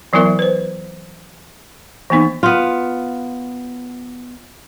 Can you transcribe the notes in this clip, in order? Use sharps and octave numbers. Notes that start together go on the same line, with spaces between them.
E3 F#3 B3 E4 A#4 E5
B4 C5
E3 A#3 B3 D#4
B3 F4